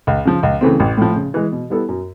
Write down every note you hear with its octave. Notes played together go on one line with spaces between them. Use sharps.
C#2
C#3 F3
C#2
C#3 E3 A3 C4
A1
A2 F3
C#3
E3 G#3
B2
G3 B3 E4 A4
F#2